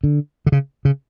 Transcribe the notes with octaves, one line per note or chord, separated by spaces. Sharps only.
D3
D3
C#3
C#3